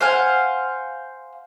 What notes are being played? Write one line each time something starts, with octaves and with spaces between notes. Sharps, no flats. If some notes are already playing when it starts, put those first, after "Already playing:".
C5 F5 F#5 G#5